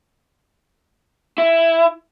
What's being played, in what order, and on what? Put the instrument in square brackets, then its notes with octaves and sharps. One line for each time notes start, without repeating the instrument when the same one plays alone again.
[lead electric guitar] E4